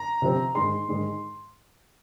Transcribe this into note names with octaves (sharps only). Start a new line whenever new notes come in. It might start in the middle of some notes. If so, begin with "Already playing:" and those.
Already playing: A#5
C3 F3 C4
G#2 D#3 G#3 C6
G#2 D#3 G#3